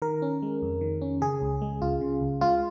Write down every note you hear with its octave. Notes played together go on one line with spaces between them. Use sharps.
D#3 A#4
C#4
G#3
F2
D#3
C#4
C#3 G#4
C#2
G#3
C#2 F4
C#3
C#2
G#3 F4